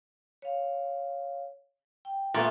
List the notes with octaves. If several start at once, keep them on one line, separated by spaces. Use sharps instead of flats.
C#5 F5
G5
A#2 G#3 A3 B3 A#4 E5